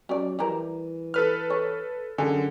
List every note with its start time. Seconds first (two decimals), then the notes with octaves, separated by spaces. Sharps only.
0.09 F#3 C#4 D5
0.39 E3 G3 E4 A#4
1.14 A4 B4 F6
1.50 C#5
2.18 F#2 D3 G#4